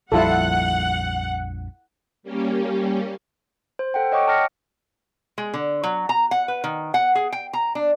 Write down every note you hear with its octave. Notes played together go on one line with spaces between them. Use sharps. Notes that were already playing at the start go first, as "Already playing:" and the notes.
A#1 F2 G3 E4 F4 A4 F#5
G3 A#3 C#4 G4
C5
A4 F#5 G5
C#5 D#5 F#5 G5 C#6 D6
D#5 A5 D6 F6 A#6 C#7
G#3
D3
F#3
A#5
F#5
B4
D#3
F#5
G#4
G5
A#5
D4